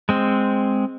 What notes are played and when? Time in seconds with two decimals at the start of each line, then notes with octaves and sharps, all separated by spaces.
0.09 G#3 C4